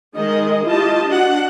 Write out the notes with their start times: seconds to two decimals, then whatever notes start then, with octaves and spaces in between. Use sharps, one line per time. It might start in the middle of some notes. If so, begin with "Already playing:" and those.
0.15 D#3 G#3 G#4 D#5
0.65 E4 F4 G4 D#5 A5
1.06 D4 F#4 F#5